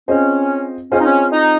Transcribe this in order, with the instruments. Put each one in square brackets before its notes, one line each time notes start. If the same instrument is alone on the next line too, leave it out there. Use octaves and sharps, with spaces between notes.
[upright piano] C4 F4 G#4 C5 D#5 [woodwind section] C#4
[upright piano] C4 F4 G#4 C5 D#5 [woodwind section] C#4
[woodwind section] D#4
C#4
D#4